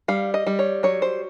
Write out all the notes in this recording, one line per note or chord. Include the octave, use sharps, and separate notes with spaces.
G3 F5
D#5
G3
C#5
F#3 C#5
C5